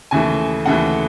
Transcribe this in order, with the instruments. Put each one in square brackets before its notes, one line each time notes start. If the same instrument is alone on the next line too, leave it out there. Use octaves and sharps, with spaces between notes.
[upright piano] D#2 C#3 E3 A3 G#5
D#2 C#3 E3 A3 F#5